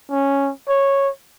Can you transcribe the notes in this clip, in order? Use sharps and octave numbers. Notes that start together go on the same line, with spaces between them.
C#4
C#5